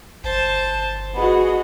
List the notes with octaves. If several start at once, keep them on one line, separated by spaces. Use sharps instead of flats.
G1 C5 A5
B3 F#4 G#4 D#5